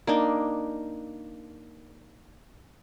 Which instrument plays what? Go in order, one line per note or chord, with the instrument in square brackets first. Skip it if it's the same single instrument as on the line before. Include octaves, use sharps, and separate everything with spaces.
[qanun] A#3 D4 D#4